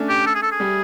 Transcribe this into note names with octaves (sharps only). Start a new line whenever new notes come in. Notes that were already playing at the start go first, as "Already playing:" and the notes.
Already playing: A3 C#4 D4
G4
A4
G#4
A4
G#4
G3